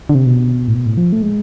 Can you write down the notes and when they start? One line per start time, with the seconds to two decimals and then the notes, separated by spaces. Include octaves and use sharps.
0.09 D3
0.15 C3
0.26 B2
0.68 A2
0.75 B2
0.86 A2
0.97 F3
1.12 A3
1.22 G#3